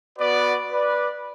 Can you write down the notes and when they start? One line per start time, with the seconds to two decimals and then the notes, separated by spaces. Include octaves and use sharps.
0.19 B3 F#4 B4 D5
0.71 B4 D5